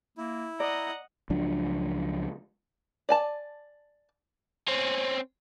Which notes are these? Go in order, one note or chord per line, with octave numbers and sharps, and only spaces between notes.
A#3 E4
D5 D#5 F#5 A#5
C#2 F3 F#3 D4
D5 G#5 A5
C4 C#4